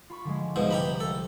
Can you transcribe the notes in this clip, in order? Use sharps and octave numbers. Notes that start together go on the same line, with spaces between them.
F4 B5 C#6
D3 F3 G#3
C2 G#2 B2 F3
G4 A#5 B5
A4